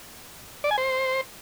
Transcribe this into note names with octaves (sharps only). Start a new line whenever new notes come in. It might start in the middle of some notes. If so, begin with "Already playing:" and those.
D5
G#5
C5